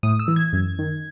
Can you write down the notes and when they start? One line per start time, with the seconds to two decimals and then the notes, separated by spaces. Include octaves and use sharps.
0.03 A2 D#6
0.19 E6
0.28 E3
0.36 G#6
0.53 F#2
0.79 D#3